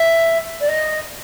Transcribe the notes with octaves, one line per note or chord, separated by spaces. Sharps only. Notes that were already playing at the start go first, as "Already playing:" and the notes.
Already playing: E5
D5
D#5